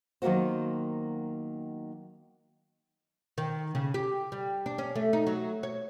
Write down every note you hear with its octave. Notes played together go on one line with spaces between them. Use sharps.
D#3 F#3 A#3 B3 F#4 C5
D#3
C#3
G4
G3
D4
C#4
A3
D#4
F#3
C#5